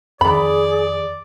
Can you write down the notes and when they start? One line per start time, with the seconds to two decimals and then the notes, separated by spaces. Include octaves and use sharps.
0.21 F2 D#3 G#4 D5 B5